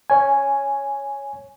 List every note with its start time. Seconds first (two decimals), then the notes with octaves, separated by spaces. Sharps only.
0.10 C#5 G#5